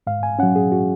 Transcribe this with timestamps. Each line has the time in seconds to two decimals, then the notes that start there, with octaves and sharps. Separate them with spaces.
0.07 G#2 F5
0.23 G#5
0.39 F#3 C#4 F#5
0.56 G#4
0.72 F#4